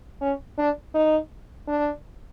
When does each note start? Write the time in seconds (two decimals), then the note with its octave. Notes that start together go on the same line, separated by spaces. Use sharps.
0.21 C#4
0.58 D4
0.94 D#4
1.68 D4